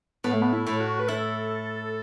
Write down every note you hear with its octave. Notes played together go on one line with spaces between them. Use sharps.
A2 B3
A3
B3
E4
A2
F#4
B4
E4 A4